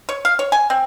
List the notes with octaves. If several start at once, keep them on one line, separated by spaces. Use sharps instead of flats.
C#5
F5
C#5
G#5
C4